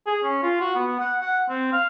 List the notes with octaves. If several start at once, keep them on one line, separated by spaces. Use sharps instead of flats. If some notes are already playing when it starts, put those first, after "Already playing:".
G#4
C#4
F4
F#4
B3
F#5
F#5
C4
F5